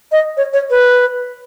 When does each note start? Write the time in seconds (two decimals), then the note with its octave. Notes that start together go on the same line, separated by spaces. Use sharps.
0.12 D#5
0.37 C#5
0.53 C#5
0.70 B4